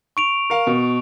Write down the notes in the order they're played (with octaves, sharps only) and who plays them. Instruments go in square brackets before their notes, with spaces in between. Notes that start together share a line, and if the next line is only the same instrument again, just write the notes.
[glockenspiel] C#6 D7 F7
[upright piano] A#4 F5
B2